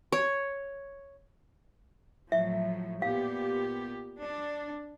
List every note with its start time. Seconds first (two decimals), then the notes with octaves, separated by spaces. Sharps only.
0.12 C#5
2.32 A2 F3 F#3 E5
3.02 A#2 B3 G4 F5
4.21 D4